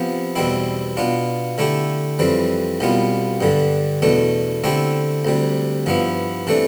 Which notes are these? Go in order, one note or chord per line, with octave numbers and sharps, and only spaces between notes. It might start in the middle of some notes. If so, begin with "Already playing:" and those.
Already playing: C3 F3 B3
E2 B2 G3 C4 E4
B2 B3 D4 F4
D3 A3 E4 G4
F2 E3 G3 C4
C2 B2 G3 B3 F4
G2 D3 G3
E2 B2 A3 D4
D3 A3 C4 E4 G4
D2 C3 G3
G2 F3 B3 E4
C3 E3 A3 D4